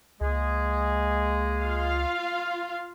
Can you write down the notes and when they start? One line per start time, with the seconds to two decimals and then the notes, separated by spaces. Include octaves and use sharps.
0.21 C#2 G#3 A#3 G#4
1.61 F4 F5